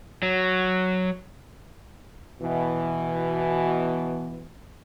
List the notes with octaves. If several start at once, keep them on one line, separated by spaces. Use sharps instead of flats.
F#3
B2 E3